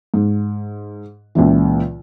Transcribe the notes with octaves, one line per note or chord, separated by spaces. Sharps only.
G#2
C#2 A#2 C#3 E3